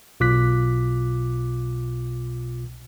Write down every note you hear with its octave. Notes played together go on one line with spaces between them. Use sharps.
B1 B2 F4 D6 F#6 B6